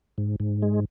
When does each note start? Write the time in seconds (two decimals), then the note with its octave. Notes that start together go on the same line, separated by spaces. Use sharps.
0.18 G#2
0.40 G#2
0.62 G#3